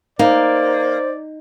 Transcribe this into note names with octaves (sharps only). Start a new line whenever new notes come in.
A#3 D#4 C5 D5